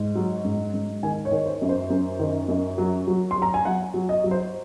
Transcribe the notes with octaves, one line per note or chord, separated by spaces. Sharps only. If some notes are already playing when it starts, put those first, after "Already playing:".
Already playing: G#2
F#3
G#2
G#2
D#3 G#5
C#5
D#3
C5
F#2
C5
F#2
D#3
F#2
F#3
F#3
C6
F#3
A#5
G#5
F#3 F#5
F#3
D#5
F#3
C5